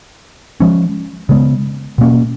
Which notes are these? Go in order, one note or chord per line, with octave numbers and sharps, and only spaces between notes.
F3 G#3 C#4
C#3 G#3 B3
B2 A#3 C#4